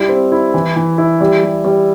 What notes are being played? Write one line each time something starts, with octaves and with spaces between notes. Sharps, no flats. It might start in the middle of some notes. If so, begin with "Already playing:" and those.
Already playing: G3 E4
C4
E4
E3
E3
E4
G3
G3
G3